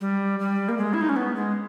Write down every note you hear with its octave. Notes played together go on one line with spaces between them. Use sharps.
G3
G3
A#3
G#3
E4
D#4
C#4
B3
G#3